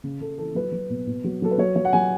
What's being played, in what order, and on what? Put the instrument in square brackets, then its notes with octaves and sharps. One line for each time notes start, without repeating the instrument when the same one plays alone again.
[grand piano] C#3
C#3 A4
E3 A4
F#3 B4
F#3
B2
B2
F#3
F#3 A4
B4
F#3 C#5
F#3 C#5
F#5
F#3 G#5